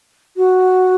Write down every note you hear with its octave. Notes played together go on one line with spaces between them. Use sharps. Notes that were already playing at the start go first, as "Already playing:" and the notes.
F#4